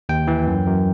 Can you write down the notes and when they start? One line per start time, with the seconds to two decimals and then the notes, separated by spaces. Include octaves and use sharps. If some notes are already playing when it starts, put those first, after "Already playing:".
0.09 D#2 G5
0.27 E3
0.47 F#2
0.67 F#2